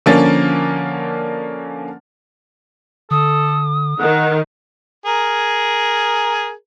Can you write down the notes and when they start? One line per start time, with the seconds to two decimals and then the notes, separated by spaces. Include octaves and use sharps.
0.06 D3 F3 A#3 C#4 A6
3.11 D3 A4 D#6
4.00 D#3 F#5
5.06 G#4 A#4